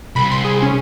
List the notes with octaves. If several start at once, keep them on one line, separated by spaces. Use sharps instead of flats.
C2 B5
C6
G#4
C#4